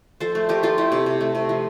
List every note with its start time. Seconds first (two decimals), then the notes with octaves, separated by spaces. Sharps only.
0.20 F3 A4 C5
0.35 A3
0.49 F3 G4 A#4
0.63 F3 F4 A4
0.78 A3 E4 G4
0.92 C3
1.06 C3
1.20 A3
1.35 C3
1.49 F3